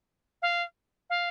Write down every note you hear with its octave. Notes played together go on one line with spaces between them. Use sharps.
F5
F5